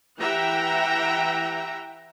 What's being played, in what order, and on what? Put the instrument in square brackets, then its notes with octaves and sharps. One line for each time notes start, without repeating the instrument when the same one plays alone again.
[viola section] E3 G4 E5 F#5 G5 A#5